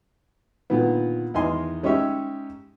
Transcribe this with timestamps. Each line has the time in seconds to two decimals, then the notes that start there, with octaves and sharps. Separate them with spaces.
0.70 A#2 D3 D#3 B3
1.34 E2 D#3 D#5 G#5 C6
1.83 G#3 C#4 D#4 G4 C#5 E5